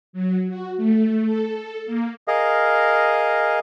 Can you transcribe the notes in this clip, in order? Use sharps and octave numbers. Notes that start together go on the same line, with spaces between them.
F#3
F#4
A3
A4
A#3
G#4 A#4 D#5 F5